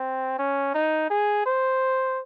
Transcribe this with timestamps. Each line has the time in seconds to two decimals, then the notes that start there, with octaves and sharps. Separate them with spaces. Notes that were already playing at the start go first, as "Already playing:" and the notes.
Already playing: C4
0.39 C#4
0.74 D#4
1.10 G#4
1.46 C5